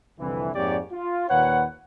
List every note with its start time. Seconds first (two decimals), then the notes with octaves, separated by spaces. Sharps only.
0.19 C2 F2 D3 E3
0.54 F2 G#2 A#3 G4 C#5 D5
0.91 F4
1.29 D#2 A#2 B4 C#5 F#5